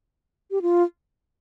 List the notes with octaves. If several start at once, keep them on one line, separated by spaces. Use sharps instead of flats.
G4
F4